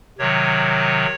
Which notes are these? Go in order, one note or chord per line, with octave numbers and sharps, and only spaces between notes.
C3 D#3 F#3 C#5